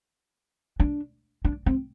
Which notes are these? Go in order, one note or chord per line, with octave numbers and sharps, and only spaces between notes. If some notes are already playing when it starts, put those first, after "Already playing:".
D4
D4
C4